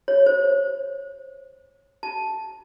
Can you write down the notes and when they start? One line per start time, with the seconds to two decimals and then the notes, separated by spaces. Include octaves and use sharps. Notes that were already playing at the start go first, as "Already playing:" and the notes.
0.08 C#5
0.26 C5
2.03 A5